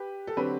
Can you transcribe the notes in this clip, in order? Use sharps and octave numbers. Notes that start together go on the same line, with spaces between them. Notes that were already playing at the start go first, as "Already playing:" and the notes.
Already playing: G4 B4
A4
D3 F#3 C4 G4 B4